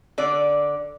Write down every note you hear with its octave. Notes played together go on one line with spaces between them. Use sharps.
D3 D5